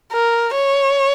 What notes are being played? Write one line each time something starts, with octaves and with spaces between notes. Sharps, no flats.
A#4
C#5